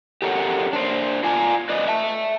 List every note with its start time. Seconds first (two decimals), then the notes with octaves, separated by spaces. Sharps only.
0.22 G4 A4 A#4 C#5 F#5
0.73 D4 C5
1.24 F4 D5 G#5 A#5
1.69 B4 D5 D#5
1.87 E5 A5